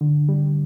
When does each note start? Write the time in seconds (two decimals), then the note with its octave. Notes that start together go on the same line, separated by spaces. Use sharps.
0.01 D3
0.29 G3